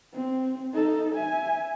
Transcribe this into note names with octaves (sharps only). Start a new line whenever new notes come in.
C4
D#4 A4
E5 G#5